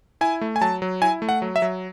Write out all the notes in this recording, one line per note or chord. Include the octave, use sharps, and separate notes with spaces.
E4 G#5
A3
G#5
F#3 A5
F#3
E4 G#5
A3
F#5
F#3
E5
F#3